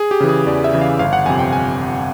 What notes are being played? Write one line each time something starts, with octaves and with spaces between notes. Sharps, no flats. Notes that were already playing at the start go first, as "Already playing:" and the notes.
Already playing: G#4
G4
C#3 E3
G#4
E2 D5
E5
C#3 E3
F5
G1 F5
F#5
F2 C3 G#5
G5
G#5